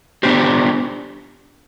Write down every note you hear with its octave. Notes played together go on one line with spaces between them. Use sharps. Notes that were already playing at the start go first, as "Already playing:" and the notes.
B3 D4 G4 C5